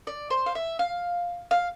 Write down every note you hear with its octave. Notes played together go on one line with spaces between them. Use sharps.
D5
C5
F5
E5
F5
F5